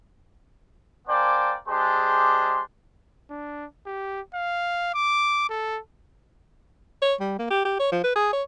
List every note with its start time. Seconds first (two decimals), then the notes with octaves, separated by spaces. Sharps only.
1.08 A#3 D4 C5 D5 G5 G#5
1.68 G#3 D4 G4 G#4 C5 C6
3.30 D4
3.86 G4
4.34 F5
4.94 D6
5.49 A4
7.02 C#5
7.20 G3
7.39 A#3
7.50 G4
7.65 G4
7.80 C#5
7.92 F3
8.04 B4
8.16 G#4
8.33 C#5